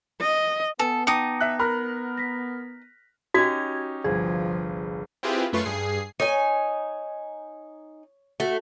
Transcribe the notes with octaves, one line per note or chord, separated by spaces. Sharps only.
D#5
B3 A4 B4 G#5 A5
D#4 G5 A5 D6 D#6 C#7
E5 F#6
A#4 B5 F6 F#6
A#6 B6
C#4 D#4 F#4 G4 G#6
G1 C2 F3 G#4
C4 E4 F4 G4 G#4 B4
F#2 A3 F4 B4 C6 C#6
G2 G#4 C7
D#4 C#5 G#5
A3 F#4